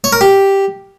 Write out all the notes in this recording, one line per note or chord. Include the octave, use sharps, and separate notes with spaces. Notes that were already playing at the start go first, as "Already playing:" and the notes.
C#5
A#4
G4